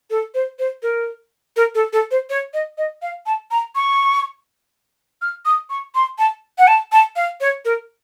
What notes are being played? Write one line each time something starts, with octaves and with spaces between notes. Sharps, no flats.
A4
C5
C5
A#4
A#4
A4
A4
C5
C#5
D#5
D#5
F5
A5
A#5
C#6
F6
D#6
C#6
C6
A5
F#5
A5
A5
F5
C#5
A#4